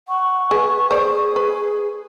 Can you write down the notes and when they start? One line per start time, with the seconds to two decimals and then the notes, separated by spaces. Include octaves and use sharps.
0.08 F#5 C#6
0.51 G#4 B4
0.91 G#4 C5 D5
1.36 B4